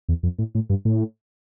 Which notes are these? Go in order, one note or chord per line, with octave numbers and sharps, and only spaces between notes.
E2
F2
A2
A2
G2
A2